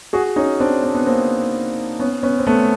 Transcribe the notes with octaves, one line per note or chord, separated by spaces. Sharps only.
F#4 G#4
C#4 D#4
C4 D4
C4 D4
B3
A#3 C4
B3 C#4
B3 C#4
C4
A3 B3